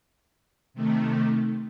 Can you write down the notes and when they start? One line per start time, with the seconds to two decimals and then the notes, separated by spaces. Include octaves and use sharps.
0.74 C3 D#3 A3